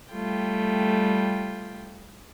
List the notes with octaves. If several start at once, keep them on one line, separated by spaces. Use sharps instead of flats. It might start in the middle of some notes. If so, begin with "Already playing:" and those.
G3 A3 F4 G5